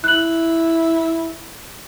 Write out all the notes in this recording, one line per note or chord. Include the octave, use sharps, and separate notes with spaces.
E4 F#6 F#7